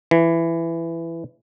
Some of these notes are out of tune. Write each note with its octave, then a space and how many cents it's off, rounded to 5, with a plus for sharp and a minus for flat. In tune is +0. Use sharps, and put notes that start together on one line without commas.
E3 +15